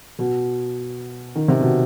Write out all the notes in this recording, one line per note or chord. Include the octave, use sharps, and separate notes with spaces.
B2
D#3
C3
B2